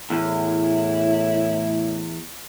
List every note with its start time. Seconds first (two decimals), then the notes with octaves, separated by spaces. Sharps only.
0.10 E2 A2 E4